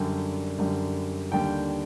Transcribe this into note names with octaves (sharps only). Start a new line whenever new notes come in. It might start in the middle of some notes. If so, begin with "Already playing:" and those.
Already playing: F#2 D3 G3
F#2 D3 G3
D#2 D3 G3 G5